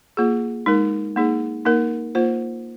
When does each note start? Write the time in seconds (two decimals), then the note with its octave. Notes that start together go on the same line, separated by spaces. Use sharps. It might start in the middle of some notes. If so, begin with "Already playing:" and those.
0.17 A#3 F4 G#4
0.66 G#3 D#4 A#4
1.16 A#3 D#4 G#4
1.66 A#3 D#4 A#4
2.15 A#3 F4 C5